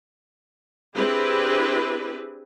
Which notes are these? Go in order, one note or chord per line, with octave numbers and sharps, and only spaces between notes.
C4 D4 E4 G4 G#4 B4